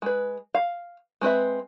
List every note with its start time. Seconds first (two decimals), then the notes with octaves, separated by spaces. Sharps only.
0.02 G#3 B4
0.55 F5
1.21 G#3 C4 B4 E5